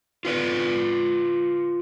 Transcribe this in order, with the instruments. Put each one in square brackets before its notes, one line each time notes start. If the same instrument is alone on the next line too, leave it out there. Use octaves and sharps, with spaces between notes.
[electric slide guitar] F4 B4 D5